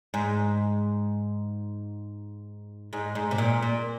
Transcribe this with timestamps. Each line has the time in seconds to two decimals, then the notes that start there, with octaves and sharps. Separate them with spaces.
0.14 G#2
2.93 G#2
3.15 G#2
3.31 C3
3.38 A#2
3.62 A#2